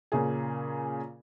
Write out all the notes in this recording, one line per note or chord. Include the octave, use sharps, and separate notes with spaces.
A#2 C#3 G#4